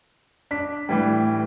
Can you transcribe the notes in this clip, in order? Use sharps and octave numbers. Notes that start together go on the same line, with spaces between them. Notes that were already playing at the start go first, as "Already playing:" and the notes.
D4 B6
A2 E3 G3